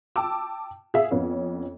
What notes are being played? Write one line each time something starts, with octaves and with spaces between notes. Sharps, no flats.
G5 A5 D6 E6
G#4 E5 F5
F2 B3 C#4